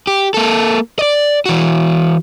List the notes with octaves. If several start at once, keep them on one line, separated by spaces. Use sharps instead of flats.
G4
A#3 A4
D5 D#5
E3 F#4